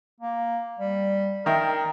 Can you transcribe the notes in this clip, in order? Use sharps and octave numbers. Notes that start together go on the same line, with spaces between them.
A#3
G3
D#3 A#4 E5 G5